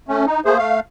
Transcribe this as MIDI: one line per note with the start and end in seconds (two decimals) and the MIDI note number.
0.08 0.26 57
0.08 0.26 61
0.26 0.40 63
0.45 0.58 57
0.45 0.58 58
0.45 0.58 68
0.45 0.58 72
0.58 0.80 57
0.58 0.80 77